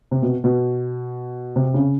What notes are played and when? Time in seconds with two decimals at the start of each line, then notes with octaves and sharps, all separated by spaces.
0.11 C3
0.22 B2
0.44 B2
1.56 C3
1.74 C#3